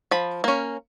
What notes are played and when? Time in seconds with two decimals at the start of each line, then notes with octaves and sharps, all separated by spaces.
0.11 F3 B5
0.44 A#3 C#4